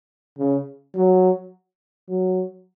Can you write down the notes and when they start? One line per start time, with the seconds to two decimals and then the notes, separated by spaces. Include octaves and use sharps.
0.38 C#3
0.95 F#3
2.09 F#3